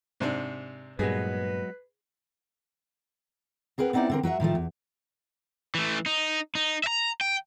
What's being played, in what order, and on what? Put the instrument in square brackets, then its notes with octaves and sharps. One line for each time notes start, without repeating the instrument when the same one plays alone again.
[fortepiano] G#2 C3 D4
[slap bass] G2 A#2 [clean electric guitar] F#3 G#3 B3 [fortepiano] G#4 [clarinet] B4
[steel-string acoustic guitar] C4 G#4 A#4 B4 F#5
B3 C4 D#4 E4 D5 F#5
D3 C4 A#4
F#3 F#4 A#4 E5
A2 D#3 F3 A3
E2
[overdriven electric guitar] E3 A3
D#4
D#4
E5 A#5
G5